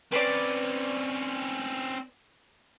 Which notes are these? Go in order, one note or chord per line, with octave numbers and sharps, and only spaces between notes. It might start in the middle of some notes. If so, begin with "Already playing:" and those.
C4 C#4 B4 D5